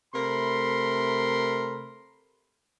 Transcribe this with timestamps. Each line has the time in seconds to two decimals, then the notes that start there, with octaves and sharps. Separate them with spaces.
0.14 C3 A3 A#4 B5 C6